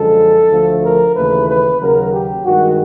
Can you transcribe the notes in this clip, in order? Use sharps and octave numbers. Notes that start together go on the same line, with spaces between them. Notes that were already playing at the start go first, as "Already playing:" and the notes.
Already playing: F#2 D3 F3 G#3 A4
D2 D3 F3 A3
A#4
D#2 C#3 E3 A3 B4
B4
D#2 C#3 F#3 A#4
G4
G2 D#3 G#3 F#4